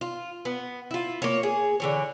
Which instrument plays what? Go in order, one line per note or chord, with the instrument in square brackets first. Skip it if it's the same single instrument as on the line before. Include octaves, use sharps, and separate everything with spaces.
[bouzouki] F4
B3
E4 F4
A#3 C#5
G#4
D3 E3 C#5